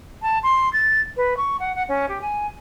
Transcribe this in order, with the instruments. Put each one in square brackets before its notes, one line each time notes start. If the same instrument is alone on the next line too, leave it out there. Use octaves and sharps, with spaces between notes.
[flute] A5
C6
A6
B4
C#6
F#5
F#5
C#4
G4
G#5